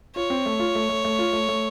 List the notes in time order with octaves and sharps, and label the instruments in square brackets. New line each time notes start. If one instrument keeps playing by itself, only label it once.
[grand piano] F4 [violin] C#5
[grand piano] C4
A3
F4
A3
A3
A3
F4
A3
A3